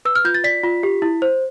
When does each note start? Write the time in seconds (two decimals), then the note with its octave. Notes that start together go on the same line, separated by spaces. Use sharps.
0.05 B4 E6
0.15 F6
0.25 F4 G6
0.34 A6
0.44 D5 B6
0.64 F4
0.83 G4
1.02 E4
1.22 C5